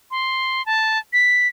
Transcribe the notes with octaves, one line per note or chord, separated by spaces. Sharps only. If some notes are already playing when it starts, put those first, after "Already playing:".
C6
A5
B6